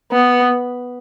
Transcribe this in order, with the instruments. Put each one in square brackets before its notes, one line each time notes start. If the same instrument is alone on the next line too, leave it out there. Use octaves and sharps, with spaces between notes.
[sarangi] B3